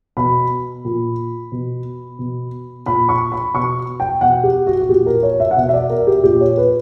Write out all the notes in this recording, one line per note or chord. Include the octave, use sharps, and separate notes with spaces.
B2 B5
A#2
B2
B2
A#2 B5
C#6
B5
B2 C#6
G5
B2 F#5
G4
F#4
F#4
A#2 G4
A#4
C#5
E5
F#5
B2 E5
E5
D5
A#4
G4
A#2 G4
C#5
B4